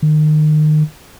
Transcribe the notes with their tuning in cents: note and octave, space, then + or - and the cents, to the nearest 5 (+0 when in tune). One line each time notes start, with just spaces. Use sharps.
D#3 -30